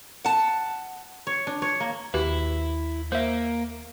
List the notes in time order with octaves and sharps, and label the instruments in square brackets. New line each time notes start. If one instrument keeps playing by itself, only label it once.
[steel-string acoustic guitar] F#5 A5
[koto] C#5
D4
C#5
A#3
[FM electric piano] D#2 [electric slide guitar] E4 [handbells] F#4 G4 B4
[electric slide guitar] A#3 [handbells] C5 E5